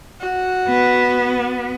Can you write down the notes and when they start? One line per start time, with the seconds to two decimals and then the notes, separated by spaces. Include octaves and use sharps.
0.20 F#4
0.68 B3